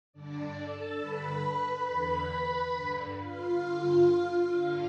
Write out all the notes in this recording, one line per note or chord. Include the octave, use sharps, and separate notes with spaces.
G2 D3 D4 D5
A4 A5
G2 D3 B4 B5
E2 D3
G2 D3
F4 F5
G2 D3
G2 D3 F4 F5